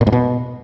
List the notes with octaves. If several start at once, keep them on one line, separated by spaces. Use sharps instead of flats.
A#2
G#2
B2